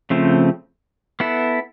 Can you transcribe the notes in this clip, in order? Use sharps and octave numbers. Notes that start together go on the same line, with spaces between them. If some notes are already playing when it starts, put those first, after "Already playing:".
C#3 F3 A3 C4
B3 E4 A4